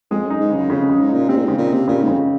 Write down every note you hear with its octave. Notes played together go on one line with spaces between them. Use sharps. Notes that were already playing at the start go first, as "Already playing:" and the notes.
F2 G#3
F#2 D#4
G#2
F#2 C#3
F2 C#3
F#2
C#3
G#2
A#2 D#4
C3 C4
A#2
G#2 C#3
A#2
C#3
C3
A#2 C#3
G#2
F2 C#3